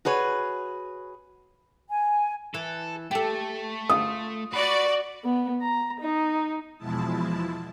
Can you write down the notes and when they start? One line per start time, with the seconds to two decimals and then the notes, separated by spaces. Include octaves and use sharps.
0.05 F#4 G#4 B4 C#5
1.89 G#5
2.54 E3 A4
3.11 A3 G4 A4
3.89 F4 D#6
4.53 F#4 B4 D5
5.24 B3
5.62 A#5
6.01 D#4
6.78 E2 B2 F3 G#3 E4 A5